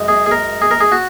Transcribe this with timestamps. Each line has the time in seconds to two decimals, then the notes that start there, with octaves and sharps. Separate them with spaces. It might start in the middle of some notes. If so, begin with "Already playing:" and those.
Already playing: F#2 G#3
0.08 G#4
0.26 G#4
0.31 A#4
0.62 G#4
0.71 A#4
0.81 G#4
0.92 F#4